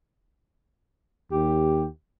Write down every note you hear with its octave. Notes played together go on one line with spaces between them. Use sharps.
D#2 G4